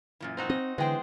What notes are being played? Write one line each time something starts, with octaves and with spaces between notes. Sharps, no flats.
F#2 A#2 E3
C4 D#4 F#4
C4 D#5
D3 E3 G#3 B3 G#4 C5 G5